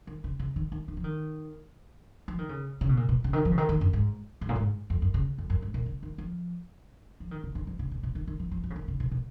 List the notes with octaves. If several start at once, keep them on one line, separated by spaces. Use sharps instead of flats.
D#3
C#3
C#3
D#3
D#3
D#3
F3
D#3
F3
D#3
C#3
C#3
B2
A#2
B2
C#3
D#3
F3
C#3
D#3
D#3
F#2
G#2
G#2
A#2
G#2
F2
F#2
C#3
F2
F#2
G#2
A#2
C#3
D#3
F3
F3
D#3
C#3
D#3
F3
C#3
A#2
B2
D#3
D#3
F3
F3
F3
C#3
D#3
C#3
B2
B2